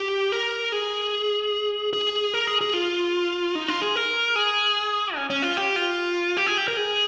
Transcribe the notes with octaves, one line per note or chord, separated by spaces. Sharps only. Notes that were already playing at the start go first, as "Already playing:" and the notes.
Already playing: G4
A#4
G#4
G#4
A#4
G#4
G#4
F4
D#4
F4
G#4
A#4
G#4
C#4
C#4
F4
G4
F4
G4
G#4
G4
A#4
G#4